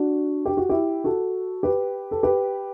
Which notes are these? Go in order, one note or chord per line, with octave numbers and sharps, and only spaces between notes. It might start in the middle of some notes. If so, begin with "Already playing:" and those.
Already playing: D4 F#4
G4
F#4
E4 G4
F#4 A4
G4 B4
A4
G4 B4